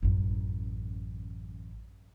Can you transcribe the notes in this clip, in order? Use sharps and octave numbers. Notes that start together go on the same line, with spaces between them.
A1 F#2